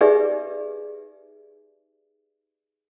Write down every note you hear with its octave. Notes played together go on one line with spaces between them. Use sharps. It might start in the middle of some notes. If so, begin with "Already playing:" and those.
D#4 G4 G#4 B4 D5 E5